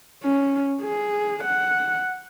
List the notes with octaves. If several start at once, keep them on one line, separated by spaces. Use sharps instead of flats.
C#4
G#4
F#5